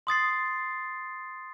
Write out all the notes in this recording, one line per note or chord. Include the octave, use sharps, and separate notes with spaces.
C6 D#6 A6 C7